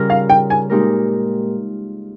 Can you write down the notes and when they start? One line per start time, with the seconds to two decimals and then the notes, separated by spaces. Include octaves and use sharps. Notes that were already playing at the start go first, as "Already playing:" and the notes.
Already playing: C#3 G3 C#4 F4 A#4
0.10 F5
0.30 G5
0.50 G#5
0.70 A#2 G#3 D#4 G4 A#4